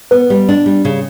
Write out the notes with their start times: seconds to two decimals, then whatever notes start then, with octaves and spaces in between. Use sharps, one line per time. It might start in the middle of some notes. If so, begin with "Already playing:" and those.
0.11 B3 B4
0.30 G3
0.49 D4
0.66 G3
0.85 C#3